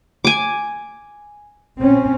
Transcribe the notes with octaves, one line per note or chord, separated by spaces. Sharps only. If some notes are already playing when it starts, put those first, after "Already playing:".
G#5 D6
A#2 C4 C#4